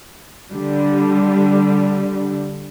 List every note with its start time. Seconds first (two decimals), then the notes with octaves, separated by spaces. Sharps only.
0.54 D3 G3